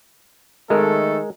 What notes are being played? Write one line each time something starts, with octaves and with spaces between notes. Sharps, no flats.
D#3 G#3 A3 A4 A#4